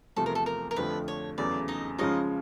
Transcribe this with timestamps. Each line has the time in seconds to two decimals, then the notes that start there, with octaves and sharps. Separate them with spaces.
0.16 E2 C3 F3 A3 A4
0.26 A#4
0.35 A4
0.46 A#4
0.71 A#4
0.76 F2 D3 F3 A3 B4
1.08 C#5
1.38 E2 C#3 F#3 A3 D5
1.68 D#4 D#5
1.98 C#3 F3 G#3 C#4 D#4 F4 D#5